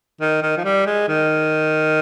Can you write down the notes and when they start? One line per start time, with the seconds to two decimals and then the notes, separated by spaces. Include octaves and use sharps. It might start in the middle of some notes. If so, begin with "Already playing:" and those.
0.21 D#3
0.42 D#3
0.57 F3
0.64 G3
0.86 G#3
1.08 D#3